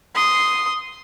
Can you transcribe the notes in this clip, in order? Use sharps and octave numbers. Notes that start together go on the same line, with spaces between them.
C6 D#6